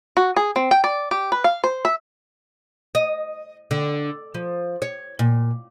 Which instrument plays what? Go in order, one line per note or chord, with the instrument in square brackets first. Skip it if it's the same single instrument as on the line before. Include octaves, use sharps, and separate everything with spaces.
[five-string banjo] F#4
G#4
C4
G5
D5
G4
B4
F5
C5
E5
[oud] D#5
D3
F3
C#5
A#2